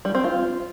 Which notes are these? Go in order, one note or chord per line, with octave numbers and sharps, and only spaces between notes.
G3
C4
F4